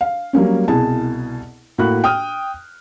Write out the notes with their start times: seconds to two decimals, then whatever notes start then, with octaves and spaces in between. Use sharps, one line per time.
0.01 F5
0.33 F#3 G3 A#3 C#4
0.68 C2 B2 E4 G#4 A5
1.78 A2 A#3 F#4 B5 F#6
2.04 G5 D#6 F6